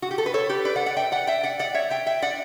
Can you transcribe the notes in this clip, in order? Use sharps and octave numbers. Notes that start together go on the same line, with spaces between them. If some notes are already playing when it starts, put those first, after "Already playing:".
F#4
G4
A4
B4
A4 C#5
G4 B4
B4 D5
D5 F#5
D5 F#5
E5 G5
D5 F#5
E5 G5
D5 F#5
D5 F#5
C#5 E5
E5 G5
E5 G5
D5 F#5